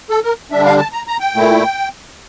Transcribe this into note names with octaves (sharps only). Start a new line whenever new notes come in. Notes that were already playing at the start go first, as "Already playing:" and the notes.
A4
A#4
D3 G3 D4 E5
F5
A5
A#5
A#5
G5
A#2 A3 E4